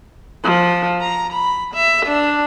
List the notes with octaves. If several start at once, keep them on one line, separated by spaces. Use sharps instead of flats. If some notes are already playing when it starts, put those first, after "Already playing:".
F3
A#5
B5
E5
D4